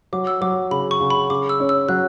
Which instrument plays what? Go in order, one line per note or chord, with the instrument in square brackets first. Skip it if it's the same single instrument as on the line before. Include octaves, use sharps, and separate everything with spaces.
[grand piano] F#3 [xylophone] D6
[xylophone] E6
[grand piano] F#3 [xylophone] D6
[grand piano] C#3 [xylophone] B5
[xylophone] C#6
[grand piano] C#3
[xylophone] B5
[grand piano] C#3 [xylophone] D6
[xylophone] E6
[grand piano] C#4
[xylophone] E6
[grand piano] F#3 [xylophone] F#6